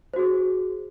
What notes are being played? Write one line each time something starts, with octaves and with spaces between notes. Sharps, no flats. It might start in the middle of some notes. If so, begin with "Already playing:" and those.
F#4 G#4 C5